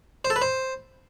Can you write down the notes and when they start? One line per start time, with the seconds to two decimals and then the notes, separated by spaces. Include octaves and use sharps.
0.25 C5
0.30 A4
0.36 B4
0.42 C5